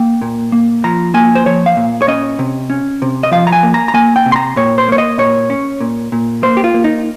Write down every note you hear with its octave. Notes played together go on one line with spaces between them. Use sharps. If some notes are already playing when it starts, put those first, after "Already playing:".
Already playing: A#3 G5
A#2
A#3
F3 A#5
A#3 G#5
C5
F3 C#5
F5
A#2
C#5
C#4 D#5
C3
C#4
C3
D#5
F3 F5
A#5
G#5
A#3
A#5
A#5
A#3 G#5
G5
C3
C6
A#5
A#2 C#5
C5
A#3 C#5
D#5
A#2 C#5
C#4
A#2
A#2
A#3 C5
G4
F4
A#3
D#4